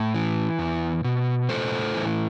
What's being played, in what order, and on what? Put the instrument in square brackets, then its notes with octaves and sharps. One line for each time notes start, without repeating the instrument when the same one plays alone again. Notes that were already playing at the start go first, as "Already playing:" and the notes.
Already playing: [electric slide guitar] A2
E3
E2
B2
A2 A4 C5
E3